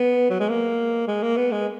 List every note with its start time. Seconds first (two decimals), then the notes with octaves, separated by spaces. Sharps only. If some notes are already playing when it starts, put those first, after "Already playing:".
Already playing: B3
0.30 F#3
0.40 G#3
0.49 A#3
1.07 G#3
1.23 A#3
1.36 B3
1.52 G#3